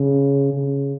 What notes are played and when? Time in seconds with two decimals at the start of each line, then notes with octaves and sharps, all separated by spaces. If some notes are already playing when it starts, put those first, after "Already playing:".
Already playing: C#3
0.54 C#3